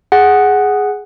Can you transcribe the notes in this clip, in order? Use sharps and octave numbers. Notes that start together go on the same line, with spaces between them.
G#4 F#5